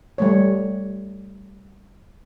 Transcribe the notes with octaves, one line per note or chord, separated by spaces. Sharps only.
G3 A3 C#5